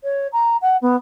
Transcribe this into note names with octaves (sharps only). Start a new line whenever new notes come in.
C#5
A#5
F#5
B3